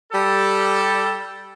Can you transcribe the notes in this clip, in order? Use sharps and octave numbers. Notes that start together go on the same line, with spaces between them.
G3 A4